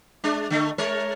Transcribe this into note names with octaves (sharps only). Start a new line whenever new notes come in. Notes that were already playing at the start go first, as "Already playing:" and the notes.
G#3 D4
D3 A3
G#3 A#4 C#5